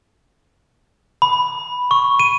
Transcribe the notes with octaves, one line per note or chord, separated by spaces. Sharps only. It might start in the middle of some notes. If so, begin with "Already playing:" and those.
B5
C#6
D#7